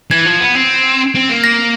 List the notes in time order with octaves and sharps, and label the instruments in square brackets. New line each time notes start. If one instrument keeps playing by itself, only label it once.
[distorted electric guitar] E3 [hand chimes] G#6
[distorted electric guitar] F3
B3
C4
C4
A#3
[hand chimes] A#6